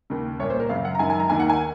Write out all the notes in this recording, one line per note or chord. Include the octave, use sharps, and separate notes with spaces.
D#2 C#3
C2 A#2 C#5
C5
A#4
F#2 C#3 F5
F#5
A#5
F#2 D#3 G#5
G#5
A#5
D#2 D#3 G#5
F#5
G#5